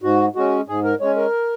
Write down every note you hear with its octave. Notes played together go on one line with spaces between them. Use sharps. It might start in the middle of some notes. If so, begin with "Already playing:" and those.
G#2 F#4
G#3 C#4 F#4
G#2 G#4
A#4
G#3 C#4 C#5
A#4